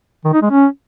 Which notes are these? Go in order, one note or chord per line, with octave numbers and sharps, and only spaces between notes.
D#3
D#4
G#3
C#4